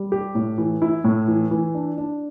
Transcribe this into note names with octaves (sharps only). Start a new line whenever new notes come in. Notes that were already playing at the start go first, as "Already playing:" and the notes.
Already playing: G3
G4
A2
E3
E4
A2
E3
E3
D4
D4